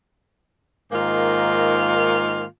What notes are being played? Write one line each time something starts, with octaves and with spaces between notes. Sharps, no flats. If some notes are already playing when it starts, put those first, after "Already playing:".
G#2 D#3 A#3 F4